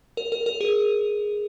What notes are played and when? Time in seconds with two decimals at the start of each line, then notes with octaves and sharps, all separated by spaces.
0.17 A#4
0.32 A#4
0.46 A#4
0.61 G#4